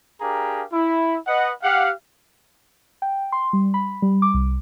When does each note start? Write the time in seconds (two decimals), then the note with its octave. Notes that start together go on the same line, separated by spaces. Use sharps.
0.21 D4 G4 G#4 A#4 F5 A#5
0.73 E4
1.27 B4 D#5 F#5
1.63 G4 F5 F#5
3.02 G5
3.32 C6
3.53 G3
3.74 B5
4.02 G3
4.22 D6
4.34 C2